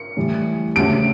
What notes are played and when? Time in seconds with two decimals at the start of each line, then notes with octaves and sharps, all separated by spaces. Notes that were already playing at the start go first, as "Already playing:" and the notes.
Already playing: C#7
0.17 A2 E3 G3
0.76 D2 C#3 G3 D7